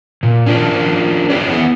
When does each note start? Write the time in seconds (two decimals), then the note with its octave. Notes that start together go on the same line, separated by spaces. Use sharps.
0.23 A#2
0.46 C#4 D4 F4 A#4
1.30 C#4 G#4 B4 C#5 D5
1.50 B3 E4 F#5